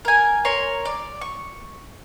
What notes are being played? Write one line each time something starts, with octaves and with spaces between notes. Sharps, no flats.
A#4 G#5
A#4 C#5 C6
D5
C#6